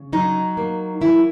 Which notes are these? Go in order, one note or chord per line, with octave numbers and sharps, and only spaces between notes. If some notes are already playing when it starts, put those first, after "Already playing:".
Already playing: C#3
F#3 D#4
A#3
E3 E4